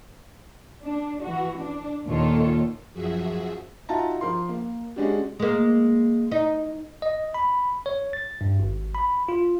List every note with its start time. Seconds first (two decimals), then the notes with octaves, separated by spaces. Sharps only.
0.82 D4
1.23 E3 F#4
1.57 D4
2.06 D#2 A#2 D#3 F4 A4 C#5
2.94 F#2 F3 F#4 G#4 E5
3.89 D#4 F4 F#4 E5 A5 A#5
4.21 F3 A#4 C6
4.49 A#3
4.96 G#3 C#4 D4 F#4 G4
5.39 G#3 A#3
6.32 D#4
7.02 D#5
7.34 B5
7.86 C#5
8.13 A6
8.41 G2
8.60 G#1
8.95 B5
9.29 F4